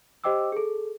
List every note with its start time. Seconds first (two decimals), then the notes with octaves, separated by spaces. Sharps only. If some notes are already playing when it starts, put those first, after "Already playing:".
0.24 G4 C5 D#5 G5 D6 E6
0.52 G#4 A4